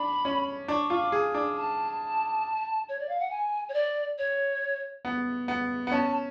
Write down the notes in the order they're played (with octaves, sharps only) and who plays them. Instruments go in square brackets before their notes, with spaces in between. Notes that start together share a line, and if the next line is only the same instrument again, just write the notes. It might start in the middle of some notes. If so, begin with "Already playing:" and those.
Already playing: [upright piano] D4 [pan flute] B5
[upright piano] C#4
[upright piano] D4 [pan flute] C#6
[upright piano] F4 [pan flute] C#6
[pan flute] D6
[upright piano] G#4
D4
[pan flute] A5
C#5
D5
F5
F#5
G#5
C#5
D5
C#5
[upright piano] B3
B3
B3
[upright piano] C#4 [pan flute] A5